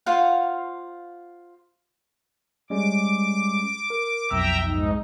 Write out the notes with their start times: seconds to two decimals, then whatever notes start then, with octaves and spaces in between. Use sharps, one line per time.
0.06 F4 C5 F5 F#5
2.70 G3 G#3 C#4 D6
3.90 A#4
4.31 B1 F2 E5 G5 A#5 E6
4.64 G#2 D#4